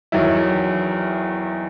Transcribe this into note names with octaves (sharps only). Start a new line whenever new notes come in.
E2 D#3 F#3 E4